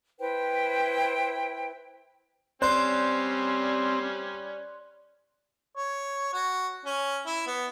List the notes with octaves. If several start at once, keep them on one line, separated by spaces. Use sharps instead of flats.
E4 B4 C5 G5
G3 C4 C#4 C5 D5 C6 F#6
C#5
F#4
C#4
E4
B3